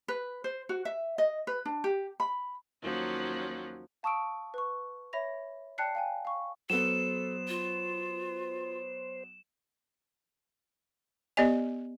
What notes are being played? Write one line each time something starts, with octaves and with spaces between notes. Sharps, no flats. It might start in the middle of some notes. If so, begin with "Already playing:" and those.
B4
C5
F#4
E5
D#5
B4
D4
G4
B5
D#2 F3 F#3 C#4
F5 A5 C#6 D#6 E6 D7
B4 C#6
C#5 E5 B5 A#6 F7
D5 G5 A5 F#6 C7 C#7
F5 G5 G#5
F5 C#6
F#3 B3 A4 C5 E7
F4
B3 G4 D5 D#5 G#5